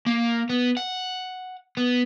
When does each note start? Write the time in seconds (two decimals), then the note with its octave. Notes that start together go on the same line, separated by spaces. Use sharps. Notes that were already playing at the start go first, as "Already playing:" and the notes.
0.06 A#3
0.50 B3
0.77 F#5
1.77 B3